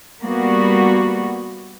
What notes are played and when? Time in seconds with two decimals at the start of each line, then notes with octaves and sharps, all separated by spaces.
0.22 G3 A#3 B3 F#4